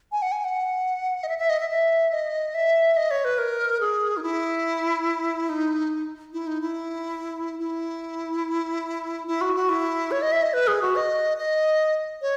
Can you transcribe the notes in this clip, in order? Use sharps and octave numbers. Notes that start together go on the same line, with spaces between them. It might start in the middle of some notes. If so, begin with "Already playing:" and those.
G#5
F#5
G#5
F#5
D#5
E5
E5
D#5
E5
E5
D#5
E5
D#5
C#5
B4
A#4
G#4
D#4
E4
D#4
E4
D#4
E4
E4
E4
F#4
F#4
E4
C#5
D#5
E5
D#5
B4
G#4
F#4
D#5
D#5
C#5